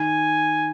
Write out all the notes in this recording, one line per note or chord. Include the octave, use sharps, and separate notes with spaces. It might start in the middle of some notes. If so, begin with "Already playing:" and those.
Already playing: D#3 G#5